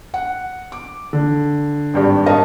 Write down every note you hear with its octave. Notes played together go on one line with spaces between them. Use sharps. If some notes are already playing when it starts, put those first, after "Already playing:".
F#5
D6
D3
G#1 G2 G4
A#4 B4 C#5 D#5 F5 A5